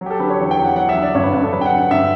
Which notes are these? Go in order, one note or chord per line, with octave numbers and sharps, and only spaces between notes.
F#3
G4
A4
D3 B4
C#5
E2
G5
E2
F#5
F#3 F#5
E5
D3
D5
G2 C#5
B4
G2 B4
A4
F#3 B4
G5
F#5
D3
F#5
G2 E5